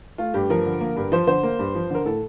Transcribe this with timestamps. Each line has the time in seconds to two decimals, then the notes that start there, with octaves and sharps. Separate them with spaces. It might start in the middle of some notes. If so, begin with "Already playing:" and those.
0.18 A3 F4
0.34 G2 G4
0.50 F3 A#4
0.66 D3
0.81 A#3
0.96 G2
1.12 F3 C5
1.27 D3 C5
1.43 A#3
1.59 G2
1.75 F3
1.90 D3 A#4
2.05 A2 A4